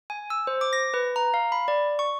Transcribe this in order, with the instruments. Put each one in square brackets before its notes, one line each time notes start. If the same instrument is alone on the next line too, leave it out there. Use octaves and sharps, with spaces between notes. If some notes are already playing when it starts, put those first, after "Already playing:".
[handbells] G#5
E6
C5
D6
A#6
B4
A#5
F5
B5
D5
C#6